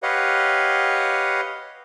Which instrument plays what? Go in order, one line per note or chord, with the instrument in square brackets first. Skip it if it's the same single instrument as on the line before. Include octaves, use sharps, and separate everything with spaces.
[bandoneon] G4 B4 C#5 D#5 F5 F#5